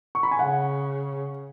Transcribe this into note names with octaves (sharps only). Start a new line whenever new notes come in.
C#6
B5
G#5
C#3 F#5